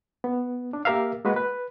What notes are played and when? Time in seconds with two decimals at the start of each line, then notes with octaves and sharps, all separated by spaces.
0.24 B3
0.73 D4
0.85 A#3 G4 A#4 E5 F5
1.25 G#3 A#3 F#4 B4
1.36 B4